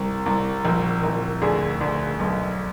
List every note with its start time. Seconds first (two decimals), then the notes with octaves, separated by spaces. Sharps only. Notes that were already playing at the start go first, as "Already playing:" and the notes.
Already playing: C2
0.26 C2
0.65 A#1
1.03 A#1
1.42 D2 G#4
1.81 D2
2.19 B1